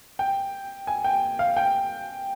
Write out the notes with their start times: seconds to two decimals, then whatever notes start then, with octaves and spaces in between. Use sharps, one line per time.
0.19 G5
0.87 G#5
1.04 G5
1.39 F5
1.57 G5